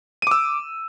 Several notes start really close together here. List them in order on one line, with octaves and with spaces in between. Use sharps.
D#7 D6 E6